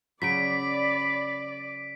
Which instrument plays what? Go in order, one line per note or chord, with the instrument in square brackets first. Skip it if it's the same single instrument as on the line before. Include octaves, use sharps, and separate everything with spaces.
[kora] C#3 F#3 [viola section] D5 [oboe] B5 [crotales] B6 D7